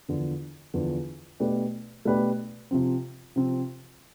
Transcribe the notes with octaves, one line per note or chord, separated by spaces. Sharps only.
E2 D3 F3
E2 D3 F3
B2 A3 D4 G4 B4
B2 A3 D4 G4 B4
C3 F3 C4
C3 F3 C4